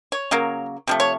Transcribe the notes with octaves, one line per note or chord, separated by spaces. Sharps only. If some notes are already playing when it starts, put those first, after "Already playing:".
C#5
C#3 F#3 A#3
C3 F3 A3
C#5